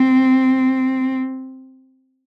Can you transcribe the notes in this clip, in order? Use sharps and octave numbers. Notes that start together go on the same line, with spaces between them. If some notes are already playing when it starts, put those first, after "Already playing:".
Already playing: C4